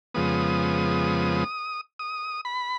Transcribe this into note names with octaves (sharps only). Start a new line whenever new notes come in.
F2 C#3 F3 G#3 B3 D#6
D#6
B5